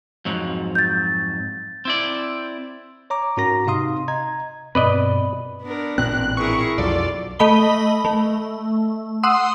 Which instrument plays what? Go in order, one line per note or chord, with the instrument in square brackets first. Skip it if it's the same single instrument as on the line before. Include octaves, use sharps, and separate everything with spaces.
[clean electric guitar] F2 G#2 F#3
[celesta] G6 A6
[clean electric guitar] C4 E4 D5
[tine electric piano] C#5 A#5 D6
G#2 C#4 F#4 A#4 A#5 A#6
C3 D#4 F5 C6 D#6
D#5 A#5 G#6
[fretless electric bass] G2 B2 C4 [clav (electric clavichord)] B4 D5 D#5
[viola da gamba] B3 D4 A#4
[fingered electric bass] A1 A#2 C4 [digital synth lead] F#6
[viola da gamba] E4 G#4 A#4 [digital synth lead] C#6
[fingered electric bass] B1 F2 F#3 [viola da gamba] F4 A4 [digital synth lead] D5
[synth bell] A3 D#5 B5 G7
A3
F#5 C6 D#6 E6